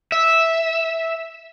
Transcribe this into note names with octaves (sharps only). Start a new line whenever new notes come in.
E5